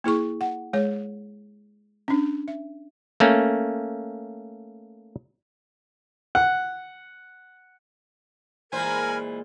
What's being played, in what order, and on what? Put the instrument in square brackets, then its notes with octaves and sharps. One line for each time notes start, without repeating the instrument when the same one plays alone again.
[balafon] A#3 E4 G#4 C#6
F#5
G#3 G#4 C#5
C#4 D4
E5
[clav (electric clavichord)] A3 A#3 C#4
[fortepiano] F#5
[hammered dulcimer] A#2 G#3 [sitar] E3 C5 [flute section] A#4 B5 [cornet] G#5